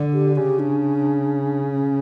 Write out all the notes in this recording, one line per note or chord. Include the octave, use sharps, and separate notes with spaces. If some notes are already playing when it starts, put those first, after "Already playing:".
Already playing: D3
G4
C#3 G4
D4
C#4